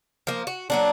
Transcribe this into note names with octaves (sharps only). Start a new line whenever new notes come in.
F3 A#3
F#4
F#3 A#3 D4